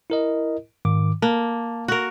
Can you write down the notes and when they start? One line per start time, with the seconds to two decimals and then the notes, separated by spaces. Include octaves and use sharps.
0.10 E4 A#4 D#5
0.85 G#2 D#3 D6
1.22 A#3 A5
1.88 F#4 A#4